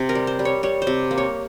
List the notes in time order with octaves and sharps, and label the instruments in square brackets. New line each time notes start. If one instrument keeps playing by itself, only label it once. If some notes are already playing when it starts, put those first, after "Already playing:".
Already playing: [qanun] C3
A#4
G3
C5
G3
C#5
G3 C#5
C5
C3
A#3
C#5